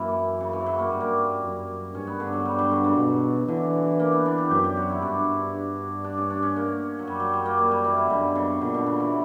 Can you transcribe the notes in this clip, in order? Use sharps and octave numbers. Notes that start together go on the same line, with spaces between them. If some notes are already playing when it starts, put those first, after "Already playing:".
Already playing: F#2 E3 A#3
C#3
E3
F#3
A#3
G2 G3
A#3
F#2
G2 C#4
B3
D3
F#3
G3
F#3
D3
C#3
B2
D3 E3
A#3
B3
D4
G4
F#2 G4
G4
F#4
E4
G2 D4
D4
C#4
D4
C#4
A#3
F#3
F#2 G3
F#3
G3
A#3
G3
G3
E3
D3
F#2 B2
C#3
A#2 D3
B2
C#3
E3